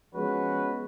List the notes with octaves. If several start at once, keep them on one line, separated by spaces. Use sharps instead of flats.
F3 G#3 B3 C#4 F#4 B4